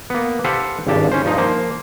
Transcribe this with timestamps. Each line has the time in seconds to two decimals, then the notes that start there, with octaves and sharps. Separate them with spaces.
0.10 A#3 B3
0.44 G4 A4 B4 C5 F5 F#5
0.87 G#1 C#2 G2 G4 A5
1.12 C#4 C5
1.24 G2 F3 D#4
1.37 F3 A#3 C5